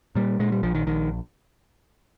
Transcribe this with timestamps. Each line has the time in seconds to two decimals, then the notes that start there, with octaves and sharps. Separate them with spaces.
0.15 A#2 G3
0.39 A#2 G#3
0.52 G3
0.63 A#1 F3
0.75 D#3
0.87 A#1 D#3